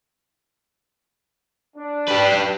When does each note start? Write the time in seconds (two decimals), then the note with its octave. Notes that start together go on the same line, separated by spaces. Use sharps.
1.76 D4
2.08 G4 B4